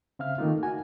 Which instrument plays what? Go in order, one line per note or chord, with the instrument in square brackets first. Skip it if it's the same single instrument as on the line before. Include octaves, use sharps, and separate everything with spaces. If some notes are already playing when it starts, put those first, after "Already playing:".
[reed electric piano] C#3 C4 E5 F5 F6
D#3 A3 A#3 D#4 F4
F#4 G#5